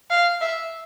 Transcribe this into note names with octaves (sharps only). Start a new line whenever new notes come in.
F5
E5